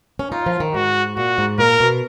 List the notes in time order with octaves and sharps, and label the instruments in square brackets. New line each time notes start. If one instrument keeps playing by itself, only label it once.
[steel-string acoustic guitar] C#4
[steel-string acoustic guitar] D#4 [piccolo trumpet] F4
[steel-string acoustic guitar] F3
D#3
[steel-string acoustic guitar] G#2 [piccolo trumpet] F#4
[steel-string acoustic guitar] A#2 [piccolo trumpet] F#4
[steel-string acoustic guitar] G#2
[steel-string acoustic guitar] A#2 [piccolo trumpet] A#4
[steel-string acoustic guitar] B2